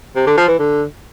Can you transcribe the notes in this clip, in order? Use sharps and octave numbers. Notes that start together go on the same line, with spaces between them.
C3
D3
F3
E3
D3